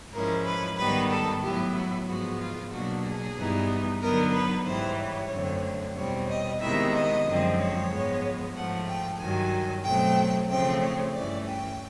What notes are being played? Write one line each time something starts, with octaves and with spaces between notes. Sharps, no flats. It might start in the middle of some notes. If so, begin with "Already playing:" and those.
G#2 F3 G#3 C#4 E4 A#4
B4
G#2 D#3 G3 B3 B4
A4
A2 F#3 B3 E4 G4
F#4
G#2 F3 G#3 B3 F#4
F4
B2 F#3 A#3 D4 F#4
G#4
G2 E3 G3 B3 D#4
D3 F#3 B3 D#4 A#4
B4
G#2 E3 G3 C5
C#5
F#2 D3 F#3 A3 C4
E2 B2 G3 C4 C#5
D#5
C3 D#3 G#3 B3 E4 E5
D#5
F#2 D3 F3 G#3 C4
C#5
G#2 F3 G#3 B3
G#2 F3 A3 F#5
G5
G2 D#3 F#3 G#5
B2 F#3 A3 C4 G5
C#3 F3 A3 C4 G5
C#5
G2 E3 A3 C#4 D5
G5